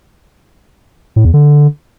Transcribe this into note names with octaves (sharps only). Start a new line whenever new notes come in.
A2
E2
D3